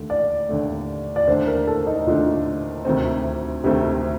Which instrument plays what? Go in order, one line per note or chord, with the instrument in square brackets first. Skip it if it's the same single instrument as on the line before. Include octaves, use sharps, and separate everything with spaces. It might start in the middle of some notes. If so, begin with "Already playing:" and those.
Already playing: [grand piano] D#2 D3 A3
[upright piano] D5
[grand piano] D#2 D3 A3
[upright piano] D5
[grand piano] D#2 D3 A3 D4 [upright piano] C5
[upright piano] A#4
A4
D#4
[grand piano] D#2 D3 A3 D4 [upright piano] F4
[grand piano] D2 C3 D#3 A3 C4
[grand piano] D2 C3 D#3 A3 C4 [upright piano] G4